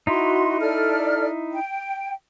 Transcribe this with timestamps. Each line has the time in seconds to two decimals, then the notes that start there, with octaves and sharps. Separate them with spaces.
0.07 D#4 E4 F#4 C6
0.60 A4 D5 F6
1.52 G5